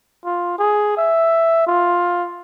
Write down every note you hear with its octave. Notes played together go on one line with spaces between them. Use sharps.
F4
G#4
E5
F4